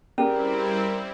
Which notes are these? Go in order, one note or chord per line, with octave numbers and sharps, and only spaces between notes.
G3 C4 C#4 E4 G4 G#4 A#4 D5